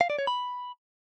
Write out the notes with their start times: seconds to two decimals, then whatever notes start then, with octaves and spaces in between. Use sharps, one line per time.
0.01 F5
0.10 D5
0.19 C#5
0.27 B5